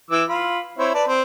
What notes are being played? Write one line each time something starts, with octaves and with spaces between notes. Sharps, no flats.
E3 D6 E6
F4 B5
C4 E4 C#5
B4 D5 A5
C4